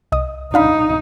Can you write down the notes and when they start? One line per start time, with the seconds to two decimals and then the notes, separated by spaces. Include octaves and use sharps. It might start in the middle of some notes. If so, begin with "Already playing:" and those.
0.12 C2 D#5 D#6
0.54 D4 D#4 F5 B5